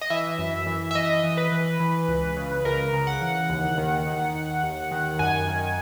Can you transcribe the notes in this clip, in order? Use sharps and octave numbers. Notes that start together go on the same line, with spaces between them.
D#5
E3 E5
F#2
E3
E5
E3 D#5
E3
B4
E3
E3
C#2
C#3
C#2 A#4
C#3
F#5
E3
D#2
D#3
D#3
D#2
D#2
D#3
F#2 G#5
D#3